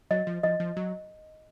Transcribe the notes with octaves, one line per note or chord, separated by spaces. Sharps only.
F#3 D#5
F3
F3 D#5
F3
F#3